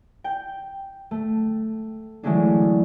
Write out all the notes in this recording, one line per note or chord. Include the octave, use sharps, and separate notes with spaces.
G5
A3
E3 F#3 G#3 A3 C#4 D4